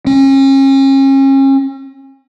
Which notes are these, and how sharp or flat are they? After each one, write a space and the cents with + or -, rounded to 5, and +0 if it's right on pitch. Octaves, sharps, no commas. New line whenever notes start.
C#4 -35